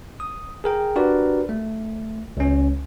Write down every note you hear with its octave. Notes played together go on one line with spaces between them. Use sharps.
D#6
G#4 A#4 G5
D4 F#4 G4 A#4 B4 D5
A3
C#2 C#4